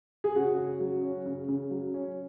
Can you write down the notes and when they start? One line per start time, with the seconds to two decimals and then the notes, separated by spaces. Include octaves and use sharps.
0.24 G#4
0.35 C#3 F#4
0.58 C#3
0.80 F#3
1.03 C#4
1.26 C#3
1.48 C#3
1.70 F#3
1.94 C#4